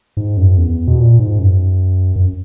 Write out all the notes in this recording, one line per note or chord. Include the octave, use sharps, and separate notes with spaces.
G#2
F#2
E2
B2
A#2
G#2
F#2
F#2